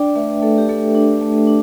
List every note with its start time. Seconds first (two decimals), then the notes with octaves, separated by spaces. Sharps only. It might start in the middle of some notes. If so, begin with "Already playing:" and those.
Already playing: D4 D5 G5
0.15 A3 B4 E5
0.42 A3 A4
0.58 G4
0.69 A3 A4
0.95 D4
1.21 A3
1.47 D4